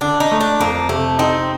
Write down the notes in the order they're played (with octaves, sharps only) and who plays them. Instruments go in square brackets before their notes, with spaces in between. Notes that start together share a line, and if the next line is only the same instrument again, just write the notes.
[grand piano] D3 [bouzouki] D4
[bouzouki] D#4
[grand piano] A3
[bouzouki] D4
[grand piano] F2 [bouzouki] A#3
[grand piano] C3 [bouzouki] A3
[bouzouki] C4 [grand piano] D#4